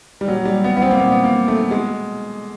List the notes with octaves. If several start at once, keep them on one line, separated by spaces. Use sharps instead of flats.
G3
A#2 F#3
G3
B3
B3
C4
A#3
A#2 B3
B3
A#3
A3
B2 G#3